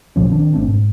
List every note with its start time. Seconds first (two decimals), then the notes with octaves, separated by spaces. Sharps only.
0.16 B1 A2 F3 C#4
0.31 D#3 C4 D4
0.54 G#1 A3 C4 D4
0.68 G#2